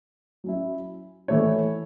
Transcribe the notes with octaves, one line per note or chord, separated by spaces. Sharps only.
F#3 C#4 E4
E3 A3 E4 C#5